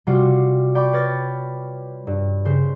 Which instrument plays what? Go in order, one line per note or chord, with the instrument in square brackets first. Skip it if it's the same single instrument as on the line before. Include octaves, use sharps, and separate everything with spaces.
[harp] C3 G3 F4 F#4
D5 G5 B5 C#6 D6
B4 C#5 F6 A6 A#6
G2
C#3 C5